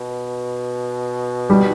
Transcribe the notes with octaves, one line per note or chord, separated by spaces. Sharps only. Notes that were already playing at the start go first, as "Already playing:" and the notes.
Already playing: B2
G3